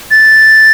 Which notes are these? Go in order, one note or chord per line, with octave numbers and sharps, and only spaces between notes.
A6